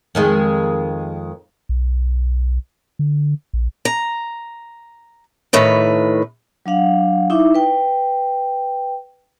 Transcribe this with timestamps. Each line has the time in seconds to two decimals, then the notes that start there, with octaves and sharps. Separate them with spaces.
0.15 F2 D#3 G#3
1.69 B1
2.99 D3
3.53 A#1
3.85 A#5
5.53 A2 D#3 B4
6.66 F#3 D4 F5 F#5
7.30 D#4 E4 E5 C#6 D6
7.54 B4 G5